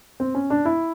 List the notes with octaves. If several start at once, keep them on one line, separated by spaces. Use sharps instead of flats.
C4
C#4
D4
E4